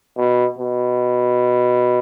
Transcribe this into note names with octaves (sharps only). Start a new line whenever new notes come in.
B2
B2